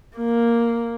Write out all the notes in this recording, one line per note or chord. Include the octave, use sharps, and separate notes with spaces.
A#3